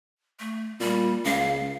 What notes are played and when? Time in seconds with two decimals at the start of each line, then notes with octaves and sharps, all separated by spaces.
0.39 A3
0.80 A#2 G3
1.25 C#2 F5